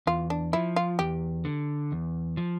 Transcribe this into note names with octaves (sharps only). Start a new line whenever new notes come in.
E2 F4
D4
F3 E4
F4
E2 G4
D3
E2
F3